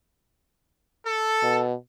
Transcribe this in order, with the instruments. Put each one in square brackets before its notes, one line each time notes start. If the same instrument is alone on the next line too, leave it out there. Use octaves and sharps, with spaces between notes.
[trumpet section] A4
[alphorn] B2